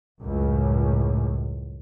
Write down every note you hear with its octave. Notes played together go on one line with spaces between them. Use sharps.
C#2 F#2 A2